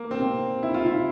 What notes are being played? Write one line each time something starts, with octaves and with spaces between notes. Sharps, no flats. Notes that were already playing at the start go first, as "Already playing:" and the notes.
Already playing: A#3
C4
E4
F4
E4